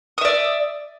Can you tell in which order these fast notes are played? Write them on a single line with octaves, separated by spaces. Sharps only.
D#6 E5 D5